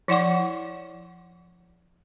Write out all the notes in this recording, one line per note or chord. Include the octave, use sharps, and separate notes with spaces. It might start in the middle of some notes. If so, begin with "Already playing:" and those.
F3 E4 D5 F#5 C#6 D6